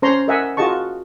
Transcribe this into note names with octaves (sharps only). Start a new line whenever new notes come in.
C#4 C5 C#5 A#5 C6
A#4 D#5 E5 F#5 G#5
F4 F#4 G#4 D#5 A5 C#6